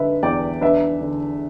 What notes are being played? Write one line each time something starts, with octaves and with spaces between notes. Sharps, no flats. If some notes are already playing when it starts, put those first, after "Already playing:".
Already playing: D3 B4 E5
E2 D5 G5
D4 B4 E5
D3